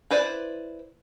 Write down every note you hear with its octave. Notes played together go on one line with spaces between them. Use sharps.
E4 B4 C5 D5